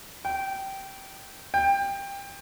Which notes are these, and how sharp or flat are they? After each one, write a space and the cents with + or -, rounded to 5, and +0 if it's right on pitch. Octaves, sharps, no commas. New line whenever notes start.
G5 -15
G5 +20